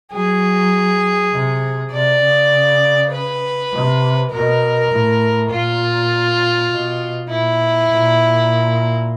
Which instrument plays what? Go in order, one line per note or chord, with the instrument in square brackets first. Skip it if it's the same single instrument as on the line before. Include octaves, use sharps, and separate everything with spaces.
[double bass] F#3 [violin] G#4
[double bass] C3
[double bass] C3 [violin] D5
[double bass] C#3
[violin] B4
[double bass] C3
[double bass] B2 [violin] A#4
[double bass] A2
[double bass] A#2 [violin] F4
[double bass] B2
[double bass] A#2 [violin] E4
[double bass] A#2